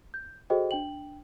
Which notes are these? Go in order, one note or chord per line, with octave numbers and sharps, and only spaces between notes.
G6
F#4 G#4 A4 C5 D#5 G5
D4 G5 F#7